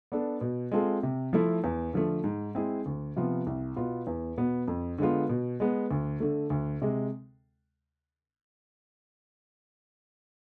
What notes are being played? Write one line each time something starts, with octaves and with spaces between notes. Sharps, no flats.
B3 D4 A4
B2
G#3 C4 F4 A4
C3
F3 A3 E4
E2
D3 F3 A3
G#2
G#3 C4 E4 G#4
D2
C3 F3 B3 F4
C2
B2 B3 F4
E2
B2 B3
F2
D3 G#3 B3 F4
B2
G#3 B3
D2
D3 A3
D2
C3 G#3